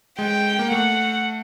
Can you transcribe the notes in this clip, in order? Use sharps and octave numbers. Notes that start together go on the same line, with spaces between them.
G#3 G5
A#3
A3 F#5